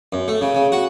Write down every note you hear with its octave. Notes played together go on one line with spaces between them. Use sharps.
F#2
A3
C#3
C#3
F#4